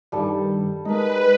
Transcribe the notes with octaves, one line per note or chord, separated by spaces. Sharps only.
G2 D#3 G3 A4 A5
G#3 D#4 A#4 B4